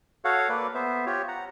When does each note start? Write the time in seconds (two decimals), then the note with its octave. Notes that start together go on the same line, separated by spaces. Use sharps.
0.25 F#4 A4 C#5 F5 F#5
0.49 A#3 A4 B4 D5
0.75 B3 C5 E5
1.06 F4 G4 C#5
1.28 F#5 A#5